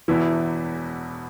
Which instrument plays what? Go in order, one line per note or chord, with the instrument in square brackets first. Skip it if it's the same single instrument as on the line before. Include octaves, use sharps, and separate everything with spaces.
[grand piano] E1 E2 B2 [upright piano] E3 E4